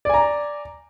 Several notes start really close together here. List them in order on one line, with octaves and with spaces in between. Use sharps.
D5 G#5 A#5